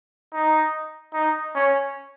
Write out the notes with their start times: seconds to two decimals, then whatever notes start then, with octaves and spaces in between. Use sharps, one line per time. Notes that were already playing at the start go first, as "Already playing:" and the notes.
0.33 D#4
1.13 D#4
1.55 C#4